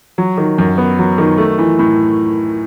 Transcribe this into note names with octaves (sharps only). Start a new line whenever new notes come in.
F#3
D#3
F#2
B3
F#3
D#3
A3
E3
A2